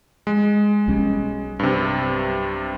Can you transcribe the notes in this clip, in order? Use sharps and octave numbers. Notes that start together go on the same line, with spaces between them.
G#3
B1 G3 C#4
G2 C3